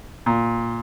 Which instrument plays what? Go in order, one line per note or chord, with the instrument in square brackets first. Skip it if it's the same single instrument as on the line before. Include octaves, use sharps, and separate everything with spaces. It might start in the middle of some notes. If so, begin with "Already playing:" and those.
[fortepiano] A#2